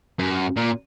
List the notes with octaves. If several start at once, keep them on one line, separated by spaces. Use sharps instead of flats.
F#2
A#2